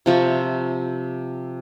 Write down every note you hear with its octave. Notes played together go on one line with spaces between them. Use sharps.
C3 F3 E5 C#6